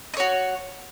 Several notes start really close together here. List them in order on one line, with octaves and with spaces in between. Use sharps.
D#5 C#5 F#4